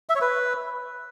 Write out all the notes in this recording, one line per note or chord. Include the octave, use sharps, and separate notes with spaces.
E5
C#5
B4